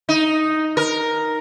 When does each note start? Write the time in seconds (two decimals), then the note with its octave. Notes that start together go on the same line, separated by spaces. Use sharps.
0.09 D#4
0.77 A#4